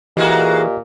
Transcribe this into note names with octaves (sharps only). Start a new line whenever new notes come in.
A#2 E3 G#3 A#3 F#4 G4 D#5